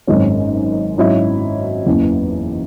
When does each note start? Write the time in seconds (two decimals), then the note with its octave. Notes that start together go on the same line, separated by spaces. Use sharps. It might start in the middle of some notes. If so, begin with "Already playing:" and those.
0.07 G#1 F#2 D#3 G#3 C#4
0.98 G#2 F#3 C#4 E4
1.86 F#1 E2 C#3 E3 B3